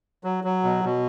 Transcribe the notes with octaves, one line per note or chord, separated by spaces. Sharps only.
F#3
F#3
B2
B2